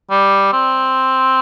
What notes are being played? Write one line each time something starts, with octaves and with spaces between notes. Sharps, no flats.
G3
C4